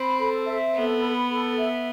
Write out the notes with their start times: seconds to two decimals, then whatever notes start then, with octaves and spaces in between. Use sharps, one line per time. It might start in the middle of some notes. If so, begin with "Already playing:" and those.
Already playing: C4 B5
0.20 A4
0.47 E5
0.75 B3 A4
1.03 B5
1.31 A4
1.58 E5